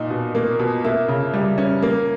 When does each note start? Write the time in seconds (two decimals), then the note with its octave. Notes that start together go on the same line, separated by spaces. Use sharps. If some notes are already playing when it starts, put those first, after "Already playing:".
Already playing: A#2 D#4
0.10 B2
0.35 A#3
0.59 B2
0.84 A#3 E5
1.08 C#3
1.34 G3
1.58 C#4
1.82 A#3